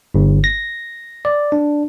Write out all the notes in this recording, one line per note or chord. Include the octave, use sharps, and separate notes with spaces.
G1
A#6
D5
D4